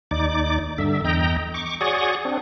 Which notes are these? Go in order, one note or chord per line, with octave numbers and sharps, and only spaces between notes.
D#2 D#4 D5 D6
G2 D3 E5
E2 D#5 G5 A#5
C#6 D6
F#4 G#4 C#5 D5 C#6 D#6
C4 D4